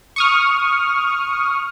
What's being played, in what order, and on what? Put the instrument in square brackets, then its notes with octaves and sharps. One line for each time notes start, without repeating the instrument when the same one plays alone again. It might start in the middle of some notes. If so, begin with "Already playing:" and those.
[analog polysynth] C#6 D#6 F6